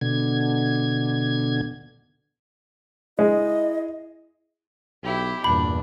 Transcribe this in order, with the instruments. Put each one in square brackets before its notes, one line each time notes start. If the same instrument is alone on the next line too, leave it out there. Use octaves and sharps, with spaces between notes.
[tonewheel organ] B2 D3 G#6
[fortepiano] G#3 [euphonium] E4 [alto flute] D#5
[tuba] B1 [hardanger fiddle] E4 G4
[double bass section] E2 G2 [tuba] A#2 [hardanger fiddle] D4 [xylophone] B5